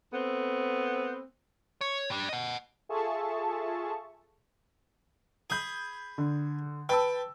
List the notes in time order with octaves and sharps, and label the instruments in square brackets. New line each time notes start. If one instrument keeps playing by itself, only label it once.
[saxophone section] A3 B3 C4
[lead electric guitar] C#5
G3 D4
D#5 F#5
[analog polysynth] F4 G#4 A4 E5 A5 C#6
[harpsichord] G#4 B5 [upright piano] D#6 G6
[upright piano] D3
[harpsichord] B4 [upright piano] G5 A5 E6